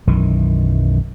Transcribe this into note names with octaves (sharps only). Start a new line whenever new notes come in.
B1 F#2 D#3 E3